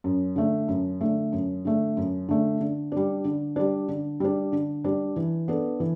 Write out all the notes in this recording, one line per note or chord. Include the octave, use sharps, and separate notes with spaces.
F#2
D3 A3
F#2
D3 A3
F#2
D3 A3
F#2
D3 A3
D3
G3 D4
D3
G3 D4
D3
G3 D4
D3
G3 D4
E3
B3 D4 A4
E3